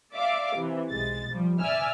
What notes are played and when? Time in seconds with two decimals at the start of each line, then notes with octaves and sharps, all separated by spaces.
0.12 D5 E5 F5 D6
0.56 C3 E3
0.91 B1 G#3 A6
1.31 F3 G3
1.60 D5 E5 G#5 E6 F6